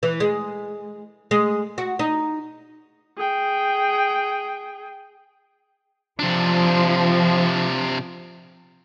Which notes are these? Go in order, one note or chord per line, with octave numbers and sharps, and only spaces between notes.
E3
G#3
G#3
F#4
D#4
G#4 G5
C3 F3 D4